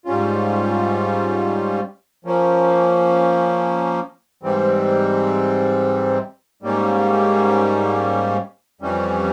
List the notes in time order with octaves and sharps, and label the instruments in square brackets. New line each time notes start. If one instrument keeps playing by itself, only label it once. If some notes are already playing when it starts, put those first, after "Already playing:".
[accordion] G#2 G3 C#4 F4
F3 A#3 C#4
G#2 E3 G3 C4
G#2 G3 A#3 C#4
F2 E3 G3 C#4